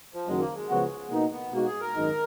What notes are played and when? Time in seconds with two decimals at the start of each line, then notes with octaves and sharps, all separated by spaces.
0.14 F3
0.27 F#1 F#2 D#3 F#3 G#3
0.41 A#3
0.55 G#3
0.69 C#2 C#3 F3 B3 F#4
1.11 B2 A#3 B3 D#4
1.32 B3
1.52 B2 G#3 A#3 D#4 F#4
1.66 G#4
1.80 A#4
1.95 G#1 F#2 D#3 G#3 D#4